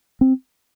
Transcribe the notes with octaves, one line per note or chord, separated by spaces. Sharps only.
C4